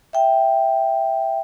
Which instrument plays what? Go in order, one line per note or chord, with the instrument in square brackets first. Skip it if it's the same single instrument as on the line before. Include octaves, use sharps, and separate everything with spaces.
[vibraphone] E5 G5